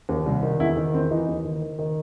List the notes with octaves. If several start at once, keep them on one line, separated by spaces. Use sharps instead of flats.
D#2
C2
D#3
E2 E4
D#3
E2 C4
E3 D#4
D#2
D#3
D#3
D#3